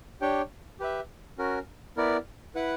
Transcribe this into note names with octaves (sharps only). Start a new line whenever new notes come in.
D4 G4 C#5 G5
G4 B4 E5
C#4 F#4 A#4
B3 E4 A#4 D5
E4 B4 F#5